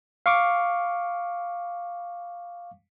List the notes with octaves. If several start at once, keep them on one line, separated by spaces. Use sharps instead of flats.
F5 C#6 D6